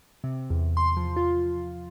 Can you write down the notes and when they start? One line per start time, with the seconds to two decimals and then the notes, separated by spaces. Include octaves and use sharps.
0.24 C3
0.50 E2
0.77 C6
0.97 F3
1.16 F4